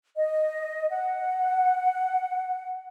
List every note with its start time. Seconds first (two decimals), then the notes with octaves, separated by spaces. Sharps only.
0.17 D#5
0.90 F#5